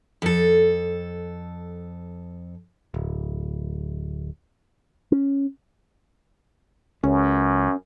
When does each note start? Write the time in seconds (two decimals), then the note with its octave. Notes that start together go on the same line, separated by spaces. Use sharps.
0.22 F2 A4
2.94 D1
5.12 C#4
7.04 C#2 F#2 C#4